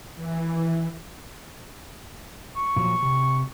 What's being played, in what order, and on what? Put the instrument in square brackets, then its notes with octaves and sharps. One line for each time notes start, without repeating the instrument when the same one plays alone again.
[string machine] E3
[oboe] C#6
[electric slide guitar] A#2 F3 F#3
C3